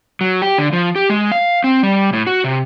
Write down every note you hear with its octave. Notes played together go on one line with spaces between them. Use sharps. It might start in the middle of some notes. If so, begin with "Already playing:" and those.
F#3
G4
D3
F3
G4
G#3
F5
C4
G3
A2
F#4
C3